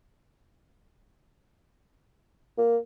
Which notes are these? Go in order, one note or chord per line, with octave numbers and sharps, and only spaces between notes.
A#3